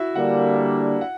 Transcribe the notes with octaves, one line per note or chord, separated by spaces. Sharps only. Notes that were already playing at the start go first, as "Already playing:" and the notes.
Already playing: E4 F#4 E5
D3 G3 A#3 D4 F#5
F#5